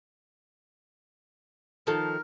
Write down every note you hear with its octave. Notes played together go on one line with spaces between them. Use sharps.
D#3 F3 A4 A#4